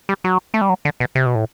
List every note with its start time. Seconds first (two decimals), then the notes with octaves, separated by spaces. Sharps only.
0.09 G3
0.24 F#3
0.54 A3
0.61 G3
0.69 F#3
0.85 D3
1.00 B2
1.15 C3
1.26 B2
1.35 A2